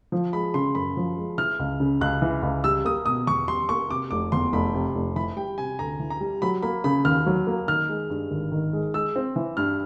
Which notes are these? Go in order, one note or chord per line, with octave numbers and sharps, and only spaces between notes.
F3
G#3 B5
C#3 C6
F#2 B5
F3
G#3
E3 F6
C#2
C#3
C#2 F#6
E3
C#2
G3 E6
A#3 D#6
B2 D#6
E2 C#6
G3 C6
A#3 C#6
C3 D6
F1 D6
E2 C6
F1 B5
C3
F1
E3 B5
G3 G5
C3 G#5
D2 A#5
E3
A#5
G3
F#3 B5
A#3 B5
C#3 B5
D#2 F6
F#3
A#3
D#3 F6
G#3
G2
G#1
D#3
G#3
G#3 E6
C4
E3
G2 F6